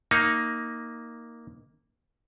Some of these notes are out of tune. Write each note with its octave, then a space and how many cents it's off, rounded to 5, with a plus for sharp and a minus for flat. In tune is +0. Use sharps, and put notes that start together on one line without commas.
A#3 +0 D#4 +10